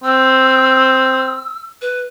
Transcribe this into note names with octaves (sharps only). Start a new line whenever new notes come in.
C4 E6
B4